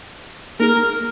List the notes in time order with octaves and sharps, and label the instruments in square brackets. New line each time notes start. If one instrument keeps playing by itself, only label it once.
[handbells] A#3 D#4 G#4 [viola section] A#4